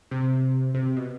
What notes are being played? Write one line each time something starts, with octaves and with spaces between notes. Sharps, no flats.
C3
C3
B2